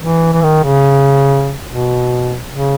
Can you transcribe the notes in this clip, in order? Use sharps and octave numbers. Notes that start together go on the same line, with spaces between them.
E3
E3
D#3
C#3
B2
C#3